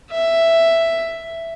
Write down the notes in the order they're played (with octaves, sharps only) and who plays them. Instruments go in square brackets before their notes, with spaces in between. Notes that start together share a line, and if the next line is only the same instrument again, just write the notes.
[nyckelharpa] E5